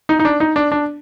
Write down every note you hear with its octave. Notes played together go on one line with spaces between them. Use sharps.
D#4
D#4
D4
D#4
D4
D4